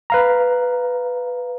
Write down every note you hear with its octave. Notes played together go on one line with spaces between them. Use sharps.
B4 F5 A#5